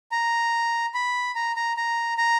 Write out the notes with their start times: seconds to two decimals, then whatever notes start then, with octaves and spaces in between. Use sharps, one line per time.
0.12 A#5
0.94 B5
1.35 A#5
1.56 A#5
1.77 A#5
2.18 A#5